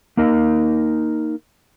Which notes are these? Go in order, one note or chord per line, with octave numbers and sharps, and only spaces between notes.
A#3 D#4 A#4 D#5